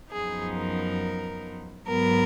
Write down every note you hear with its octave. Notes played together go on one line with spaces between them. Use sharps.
F#2 F3 B3 D#4 G#4
A#4
G#2 F#3 B3 A#4